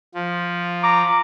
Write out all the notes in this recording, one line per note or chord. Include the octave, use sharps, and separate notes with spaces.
F3
A#5 D6